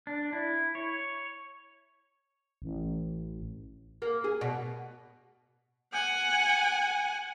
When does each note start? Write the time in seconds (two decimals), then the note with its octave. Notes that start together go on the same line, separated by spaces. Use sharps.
0.07 D4
0.33 E4
0.75 C#5
2.62 A1
4.02 A#3
4.24 G#4
4.41 B2
5.93 F#5 G#5